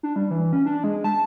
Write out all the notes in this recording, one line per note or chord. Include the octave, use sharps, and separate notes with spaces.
D4
G3
E3
C#4
D4
G#3
A5